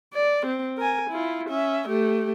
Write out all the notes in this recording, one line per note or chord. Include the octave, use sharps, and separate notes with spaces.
D5
C4
A#4 G#5
E4 F4
C#4 E5
A3 G4